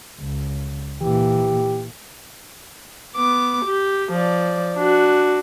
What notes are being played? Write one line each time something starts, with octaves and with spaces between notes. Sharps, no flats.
C#2
A#2 E3 G4
B3 D6
G4
F3 D5
D4 F#4